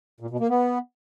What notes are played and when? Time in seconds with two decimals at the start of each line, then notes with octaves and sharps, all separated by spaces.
0.20 A#2
0.30 B2
0.40 A#3
0.49 B3